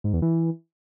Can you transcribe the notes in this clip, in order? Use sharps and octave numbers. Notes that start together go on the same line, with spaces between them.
G#2
E2
E3